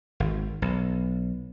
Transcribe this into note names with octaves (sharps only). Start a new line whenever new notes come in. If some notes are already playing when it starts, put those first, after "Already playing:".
G#1
B1